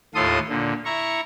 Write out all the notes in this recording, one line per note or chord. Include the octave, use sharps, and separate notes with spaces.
D#2 A2 F4 A4 C6 D#6
A#2 D3
E4 A#5 C#6